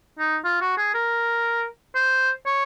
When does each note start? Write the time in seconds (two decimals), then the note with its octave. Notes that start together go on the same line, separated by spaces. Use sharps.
0.19 D#4
0.44 F4
0.61 F#4
0.78 G#4
0.94 A#4
1.95 C5
2.45 C#5